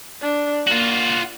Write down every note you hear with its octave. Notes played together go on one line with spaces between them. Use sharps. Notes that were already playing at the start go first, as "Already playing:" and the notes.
D4
A#3 F4 F#4